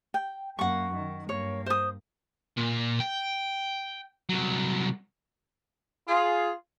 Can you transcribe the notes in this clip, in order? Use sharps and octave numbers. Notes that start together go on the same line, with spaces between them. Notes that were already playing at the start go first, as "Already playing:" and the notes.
G5
F#2 A#3 F#5 C#6
D#3
G2 A#3 C#5
C5 D#6
A#2
G5
C2 F#3
F4 G#4